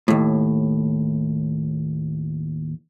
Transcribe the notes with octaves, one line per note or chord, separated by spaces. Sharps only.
D#2 A2